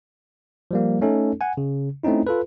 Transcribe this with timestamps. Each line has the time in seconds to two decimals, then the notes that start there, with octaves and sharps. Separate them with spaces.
0.71 F3 G3 A#3
1.01 A3 C#4 D#4 A4
1.41 F#5 G#5
1.57 C#3
2.03 A3 C4 C#4 D#4 E4
2.27 F4 A4 B4